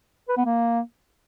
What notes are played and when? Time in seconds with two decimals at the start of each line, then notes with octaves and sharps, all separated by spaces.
0.28 B4
0.37 B3
0.45 A#3